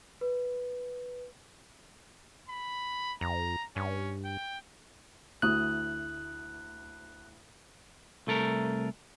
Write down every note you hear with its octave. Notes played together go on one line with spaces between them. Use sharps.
B4
B5
F2 A#5
G2 C#4
G5
D2 E4 D#6 F#6
C2 A3 A4 A#4